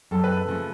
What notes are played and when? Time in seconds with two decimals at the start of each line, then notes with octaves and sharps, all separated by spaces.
0.11 F#2 A4
0.24 B4
0.37 A4
0.47 C#3 F3 A3